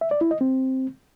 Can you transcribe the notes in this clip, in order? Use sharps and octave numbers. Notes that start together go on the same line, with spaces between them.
E5
D5
E4
D#5
C4